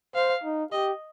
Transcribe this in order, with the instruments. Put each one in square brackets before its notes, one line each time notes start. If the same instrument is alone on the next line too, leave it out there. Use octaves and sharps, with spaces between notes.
[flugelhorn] C5 [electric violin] F5
[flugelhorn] D#4
[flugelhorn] G4 [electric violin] D#5